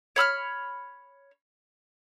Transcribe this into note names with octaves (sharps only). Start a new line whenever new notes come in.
C#5 B5 E6 F6